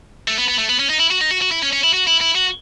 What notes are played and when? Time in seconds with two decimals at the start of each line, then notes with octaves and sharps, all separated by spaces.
0.28 A3
0.38 B3
0.48 B3
0.58 A3
0.69 B3
0.79 C#4
0.90 D#4
0.99 E4
1.11 F#4
1.21 D#4
1.31 F#4
1.42 F#4
1.51 E4
1.63 C#4
1.73 C#4
1.84 E4
1.93 F#4
2.07 E4
2.21 E4
2.35 F#4